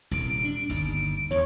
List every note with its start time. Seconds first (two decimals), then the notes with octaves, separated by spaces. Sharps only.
0.11 D#1 C2 D7
0.44 D4
0.69 G1 D#2
1.31 E2 C#5